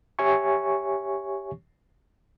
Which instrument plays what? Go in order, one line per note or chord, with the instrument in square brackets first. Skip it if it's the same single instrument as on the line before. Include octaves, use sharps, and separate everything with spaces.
[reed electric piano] G4 C#5 E5 G#5 C#6